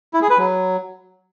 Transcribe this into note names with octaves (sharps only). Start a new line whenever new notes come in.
E4
G#4
B4
F#3